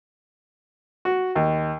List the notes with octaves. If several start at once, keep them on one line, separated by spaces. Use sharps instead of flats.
F#4
D#2